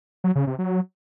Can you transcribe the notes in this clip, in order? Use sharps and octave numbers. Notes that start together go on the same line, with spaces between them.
F#3
C#3
C3
F#3